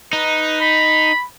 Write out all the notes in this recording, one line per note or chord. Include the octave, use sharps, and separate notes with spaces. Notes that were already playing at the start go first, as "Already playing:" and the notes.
D#4 B4
B5